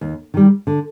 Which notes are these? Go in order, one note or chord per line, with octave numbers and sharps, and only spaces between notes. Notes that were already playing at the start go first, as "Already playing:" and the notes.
D#2
D#3 G3
D3